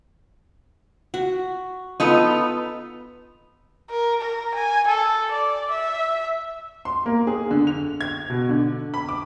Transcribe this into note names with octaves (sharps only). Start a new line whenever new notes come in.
F#4
B3 D#4 F4 A4 B4
A#4
A#4
G#5
A4
D5
E5
C6
A#3
G#4
D3
F7
G#6
B2
D3
B5
D6